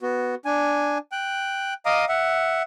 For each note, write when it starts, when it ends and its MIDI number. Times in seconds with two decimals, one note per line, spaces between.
0.02 0.35 59
0.02 0.35 66
0.45 0.98 62
0.45 0.98 80
1.12 1.74 79
1.12 1.74 90
1.86 2.05 75
1.86 2.05 77
1.86 2.05 82
1.86 2.05 86
1.86 2.05 87
2.09 2.62 76
2.09 2.62 78